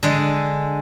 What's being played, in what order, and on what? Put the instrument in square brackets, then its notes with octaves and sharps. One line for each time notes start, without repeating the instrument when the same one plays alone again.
[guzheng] D3 G#3